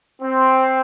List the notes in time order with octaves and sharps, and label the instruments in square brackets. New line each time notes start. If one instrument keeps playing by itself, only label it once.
[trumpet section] C4